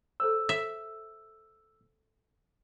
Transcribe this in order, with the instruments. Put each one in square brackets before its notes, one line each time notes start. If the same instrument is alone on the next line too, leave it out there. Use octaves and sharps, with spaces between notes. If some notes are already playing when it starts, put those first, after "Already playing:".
[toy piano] A4 C5 C#5 [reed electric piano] E6
[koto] E5